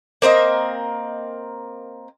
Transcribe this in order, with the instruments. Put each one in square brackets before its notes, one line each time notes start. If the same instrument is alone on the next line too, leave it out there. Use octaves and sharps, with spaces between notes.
[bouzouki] A#3 C4 A#4 D#5